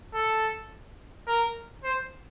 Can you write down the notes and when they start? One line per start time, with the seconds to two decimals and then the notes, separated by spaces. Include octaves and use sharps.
0.14 A4
1.27 A#4
1.84 C5